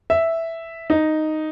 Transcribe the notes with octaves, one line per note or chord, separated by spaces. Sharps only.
E5
D#4